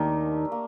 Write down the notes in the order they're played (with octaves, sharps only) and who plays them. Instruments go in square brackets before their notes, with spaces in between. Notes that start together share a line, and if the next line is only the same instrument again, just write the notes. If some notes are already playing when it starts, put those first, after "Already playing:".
Already playing: [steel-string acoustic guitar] D#2 D#3 [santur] A3 D4 G4 A#4
[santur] A#3